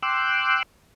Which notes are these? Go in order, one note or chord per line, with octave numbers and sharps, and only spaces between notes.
G5 C6 D6 E6 F#6